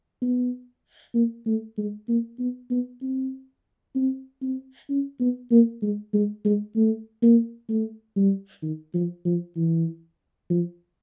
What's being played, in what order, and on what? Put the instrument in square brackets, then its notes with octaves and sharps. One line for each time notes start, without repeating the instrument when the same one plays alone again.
[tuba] B3
A#3
A3
G#3
A#3
B3
B3
C4
C4
C4
C#4
B3
A#3
G#3
G#3
G#3
A3
A#3
A3
G3
D#3
F3
F3
E3
F3